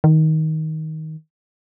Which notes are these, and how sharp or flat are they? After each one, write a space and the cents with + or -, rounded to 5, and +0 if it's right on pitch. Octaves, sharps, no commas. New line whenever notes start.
D#3 +15